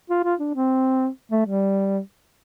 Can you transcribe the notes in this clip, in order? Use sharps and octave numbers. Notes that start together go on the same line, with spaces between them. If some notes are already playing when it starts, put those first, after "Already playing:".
F4
F4
D4
C4
A3
G3